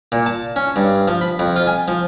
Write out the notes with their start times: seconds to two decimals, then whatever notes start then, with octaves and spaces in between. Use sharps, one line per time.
0.12 A#2
0.26 A5
0.56 C#4
0.76 G2
1.08 F3
1.21 B5
1.39 F2
1.56 F4
1.67 G#5
1.88 F3